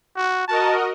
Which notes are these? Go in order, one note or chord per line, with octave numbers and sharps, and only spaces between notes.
F#4
F#4 A#4 D#5 A5